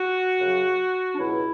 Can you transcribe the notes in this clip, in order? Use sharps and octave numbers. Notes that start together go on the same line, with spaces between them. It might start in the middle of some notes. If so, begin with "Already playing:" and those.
Already playing: F#4
F#2 C#3 F#3
D4
C#2 B2 F#3 E4